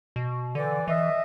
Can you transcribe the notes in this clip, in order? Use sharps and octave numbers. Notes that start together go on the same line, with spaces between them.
B2
D3 E3 D5
E3 D#5 E5